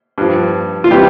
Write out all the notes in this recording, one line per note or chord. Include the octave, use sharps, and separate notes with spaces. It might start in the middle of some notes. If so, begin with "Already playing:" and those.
G2 F3
F4
C3 E3 G3 G4